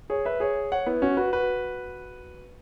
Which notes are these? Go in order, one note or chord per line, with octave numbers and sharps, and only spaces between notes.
G#4 C#5
B4 E5
G#4 C#5
C#5 F#5
B3 E4
C#4 F#4
F#4 B4
F#4 B4